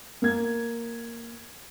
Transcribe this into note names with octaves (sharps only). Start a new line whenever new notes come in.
A#3 G#6